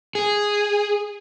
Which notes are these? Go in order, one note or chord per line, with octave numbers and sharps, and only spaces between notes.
G#4